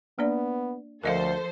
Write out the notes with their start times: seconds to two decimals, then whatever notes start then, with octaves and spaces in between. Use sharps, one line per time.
0.19 A#3 B3 D4 D5
1.04 D2 F3 A4 A#4 C5 D#5 F5